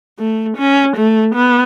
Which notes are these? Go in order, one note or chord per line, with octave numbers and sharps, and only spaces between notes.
A3
C#4
A3
B3